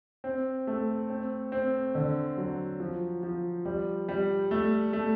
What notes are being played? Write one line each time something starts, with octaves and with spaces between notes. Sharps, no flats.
C4
A3
C4
C4
D3
F#3
F3
F3
G3
G3
A3
A3